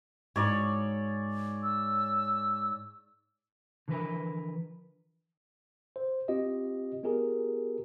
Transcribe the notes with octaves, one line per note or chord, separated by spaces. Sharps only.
G#2 C#5 D5
E6
D3 E3 F3 A#4 B4
C5
C4 F4 G4 D#5
B3 F4 G4 G#4 A#4